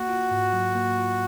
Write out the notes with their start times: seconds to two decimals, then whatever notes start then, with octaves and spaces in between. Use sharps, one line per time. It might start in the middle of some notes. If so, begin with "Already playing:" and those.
Already playing: A#3 F#4
0.09 F4
0.31 G#2
0.53 F#3
0.75 A#3
0.98 F4